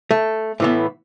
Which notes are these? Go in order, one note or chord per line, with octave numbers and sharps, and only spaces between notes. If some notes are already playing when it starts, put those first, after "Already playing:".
A3
A2 E3 B3